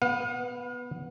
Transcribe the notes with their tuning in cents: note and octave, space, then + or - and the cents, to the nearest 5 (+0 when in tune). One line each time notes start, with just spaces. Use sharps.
B3 +0 F5 +45